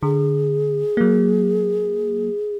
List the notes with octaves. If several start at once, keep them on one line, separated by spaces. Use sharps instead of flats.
D3 G#4
F#3 A#3